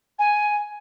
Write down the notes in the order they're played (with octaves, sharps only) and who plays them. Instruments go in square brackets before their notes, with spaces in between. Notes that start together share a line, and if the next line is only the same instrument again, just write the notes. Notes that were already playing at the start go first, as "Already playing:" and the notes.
[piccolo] G#5